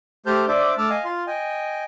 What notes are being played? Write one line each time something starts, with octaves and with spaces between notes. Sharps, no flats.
A3 G4 C5 A5 F6 G6
D4 C5 D5 E5 D6
A3 A5 D6 E6 F6
D#5 F5 G#5
F4 F5 C6
D#5 G5 G#5